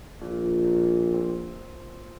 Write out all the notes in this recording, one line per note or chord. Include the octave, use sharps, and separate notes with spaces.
A#1 A#2
C4